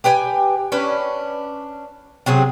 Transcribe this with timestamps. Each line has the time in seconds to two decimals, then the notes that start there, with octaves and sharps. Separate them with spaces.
0.04 G4 B4 G5 G#5
0.72 C#4 D4 B4
2.26 C3 F#3 C4 G#4